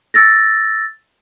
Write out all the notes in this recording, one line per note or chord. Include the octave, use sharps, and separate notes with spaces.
E6 A6 A#6